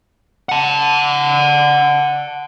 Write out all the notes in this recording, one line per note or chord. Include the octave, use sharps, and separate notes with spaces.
F#5 A5